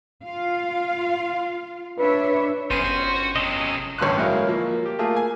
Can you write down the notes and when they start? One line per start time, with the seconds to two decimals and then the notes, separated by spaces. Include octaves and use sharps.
0.23 F4 F5
1.99 D4 B4 C#5 E5
2.70 G1 F#2 C#4 G#4 C5 D#7
2.85 F#4
3.36 C3 F#3 G#4 A4 D#5
3.99 A1 G2 D3 C6 F#6
4.17 F#3 G#3 E4 A#4 C#5 F5
4.47 F3 A#3
4.86 G4
4.99 A3 A#3 F4 G#4
5.16 G#5